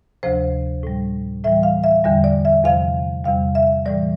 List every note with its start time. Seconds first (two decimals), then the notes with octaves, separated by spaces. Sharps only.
0.23 D2 C3 F3 C5
0.83 A2 G3
1.44 A2 E3 G3 E5
1.63 F5
1.84 E5
2.04 E2 D3 G3 E5
2.24 D5
2.45 E5
2.64 E2 C3 F3 F5
3.24 E2 C3 G3 F5
3.55 E5
3.86 A2 E3 G3 D5